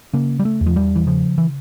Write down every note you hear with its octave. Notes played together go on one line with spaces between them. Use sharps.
C#3 A#3
G3
A3
E2
F3
G3
E3
C#3 F3
E3